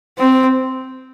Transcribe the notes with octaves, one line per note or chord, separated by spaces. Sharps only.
C4